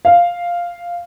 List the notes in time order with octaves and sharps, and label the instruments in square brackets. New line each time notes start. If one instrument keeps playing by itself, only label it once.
[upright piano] F5